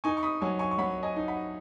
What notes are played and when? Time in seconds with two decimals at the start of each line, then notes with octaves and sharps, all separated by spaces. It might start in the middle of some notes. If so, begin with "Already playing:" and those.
0.04 D#4 G#5 C#6
0.17 C#6
0.23 B5 D#6
0.41 F#3 G#5 C#6
0.59 G#5 C#6
0.71 C#6
0.78 F#3 F#5 B5
1.03 D#5 G#5
1.16 D#4
1.28 F#5 B5